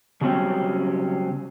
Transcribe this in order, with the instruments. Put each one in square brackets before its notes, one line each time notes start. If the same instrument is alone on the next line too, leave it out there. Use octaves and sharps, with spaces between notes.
[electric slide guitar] C#3 F#3 G3 C4 C#4 G4